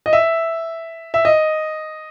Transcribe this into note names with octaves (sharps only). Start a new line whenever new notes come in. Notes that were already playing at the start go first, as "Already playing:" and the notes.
D#5
E5
E5
D#5